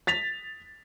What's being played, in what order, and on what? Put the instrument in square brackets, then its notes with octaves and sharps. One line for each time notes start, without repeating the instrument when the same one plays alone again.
[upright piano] A6 B6 F7